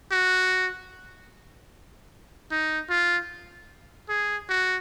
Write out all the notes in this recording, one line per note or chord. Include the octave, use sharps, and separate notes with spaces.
F#4
D#4
F4
G#4
F#4